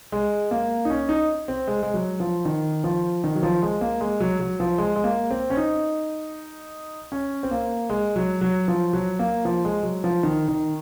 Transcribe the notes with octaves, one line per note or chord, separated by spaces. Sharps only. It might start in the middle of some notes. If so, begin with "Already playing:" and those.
G#3
A#3
D#4
C#4
D#4
C4
G#3
G#3
F#3
F3
D#3
F3
D#3
F#3
F3
G#3
A#3
G#3
F#3
F#3
F3
G#3
G#3
A#3
C4
C#4
D#4
C#4
C4
A#3
G#3
F#3
F#3
F3
F#3
A#3
F3
G#3
F#3
F3
D#3
D#3